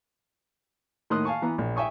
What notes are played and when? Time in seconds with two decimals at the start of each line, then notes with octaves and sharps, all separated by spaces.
1.10 A2 D#3 A#3 C6 D#6 F#6
1.25 F5 G#5 A5 C#6
1.42 E3 B3 A#5
1.58 A#1
1.76 E5 G5 G#5 C#6 D#6